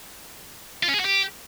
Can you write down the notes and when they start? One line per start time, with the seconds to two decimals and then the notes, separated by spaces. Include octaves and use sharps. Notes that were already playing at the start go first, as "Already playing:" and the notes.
0.83 F4
0.88 C#4
0.94 G#4
1.00 F#4
1.05 G4